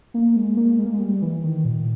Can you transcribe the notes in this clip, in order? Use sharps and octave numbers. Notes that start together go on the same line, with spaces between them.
A#3
G#3
A#3
G#3
A#3
G#3
G3
E3
D#3
A#2